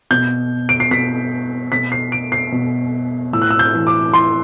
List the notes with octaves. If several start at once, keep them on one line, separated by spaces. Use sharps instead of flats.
B2 G6
D7
C7
B2 B6
B2 B6
C7
D7
C7
B2
A2 E6
F#6
E6
G6
E3
D6
A2 C6